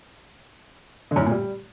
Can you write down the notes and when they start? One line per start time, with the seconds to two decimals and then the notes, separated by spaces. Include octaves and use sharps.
1.11 D3
1.16 F#2
1.21 A2
1.26 A#2
1.31 G3